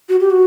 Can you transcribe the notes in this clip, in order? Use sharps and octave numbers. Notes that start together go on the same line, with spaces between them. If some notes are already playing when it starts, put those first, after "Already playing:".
F#4
G4
F#4